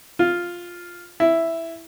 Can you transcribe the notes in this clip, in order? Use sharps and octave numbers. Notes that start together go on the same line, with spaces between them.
F4
E4